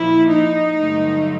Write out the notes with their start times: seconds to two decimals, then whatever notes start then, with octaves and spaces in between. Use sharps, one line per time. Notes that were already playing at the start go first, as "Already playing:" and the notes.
Already playing: A#2 F3 A#3 E4
0.28 D#4
0.74 G2 D3 F#3 A3